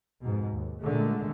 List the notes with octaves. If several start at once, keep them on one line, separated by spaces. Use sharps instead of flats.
F2 G#2 B2
D#2
A#2 D3 D#3 G#3 A3